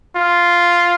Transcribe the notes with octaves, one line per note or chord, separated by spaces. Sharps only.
F4